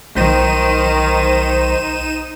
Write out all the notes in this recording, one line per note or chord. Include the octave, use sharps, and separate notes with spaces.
B1 D#3 D#4 C5 D#7 E7